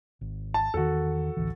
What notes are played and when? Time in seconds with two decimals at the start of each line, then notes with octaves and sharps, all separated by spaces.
0.21 G#1
0.54 A5
0.74 E2 D#3 F#4 A4
1.37 A1 D2 E3